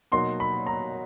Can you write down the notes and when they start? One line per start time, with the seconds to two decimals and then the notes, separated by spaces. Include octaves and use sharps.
0.12 B2 F#3 A#3 D#4 F#4 C6
0.40 B5
0.67 A#5